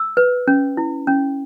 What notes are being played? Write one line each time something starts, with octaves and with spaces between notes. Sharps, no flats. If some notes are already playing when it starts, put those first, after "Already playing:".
Already playing: E6
B4
C#4
E4
C#4